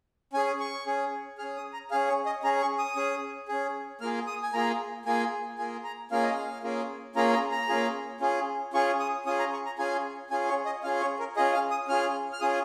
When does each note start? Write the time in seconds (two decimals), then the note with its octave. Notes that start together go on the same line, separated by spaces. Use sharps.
0.33 C#4 G#5
0.37 G#4
0.60 C#6
0.86 C#4 G#4
1.38 G#4 F6
1.43 C#4
1.57 D#6
1.73 A#5
1.91 C#4 G#4 F5
2.08 C#5
2.26 D#5
2.43 C#4 G#4 A#5
2.61 C#6
2.79 D#6
2.96 C#4 G#4
3.48 C#4 G#4
4.01 A#3 F4 G#4 F6
4.27 D#6
4.43 G#5
4.54 A#3 F4 G#4 A#5
5.05 A#3 F4 G#4 G#5
5.58 A#3 F4 G#4 G#5
5.84 A#5
6.11 A#3 C#4 F4 G#4 F5
6.23 D#5
6.34 F5
6.63 A#3 C#4 F4 G#4
7.16 A#3 C#4 F4 G#4 A#5
7.33 A#5
7.52 A#5
7.69 A#3 C#4 F4 G#4
8.21 C#4 F4 G#4
8.73 C#4 F4 G#4 C#6
9.00 D#6
9.26 C#4 F4 G#4 D#6
9.39 A#5
9.53 C#6
9.66 A#5
9.78 C#4 F4 G#4 G#5
10.30 C#4 F4 G#4 G#5
10.49 C#5
10.66 D#5
10.84 C#4 F4 G#4 F5
11.01 C#5
11.19 A#4
11.36 C#4 F4 G#4 D#5
11.54 F5
11.71 D#6
11.89 C#4 F4 G#4 F6
12.33 F6
12.41 C#4 F4 G#4 D#6